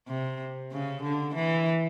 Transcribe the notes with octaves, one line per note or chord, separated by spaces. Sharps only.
C3
C#3
D3
E3